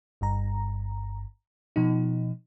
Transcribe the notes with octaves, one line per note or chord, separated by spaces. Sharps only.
G1 G2 A#5
B2 F3 D#4